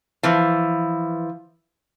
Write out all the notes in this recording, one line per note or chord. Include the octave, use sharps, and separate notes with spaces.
E3 F3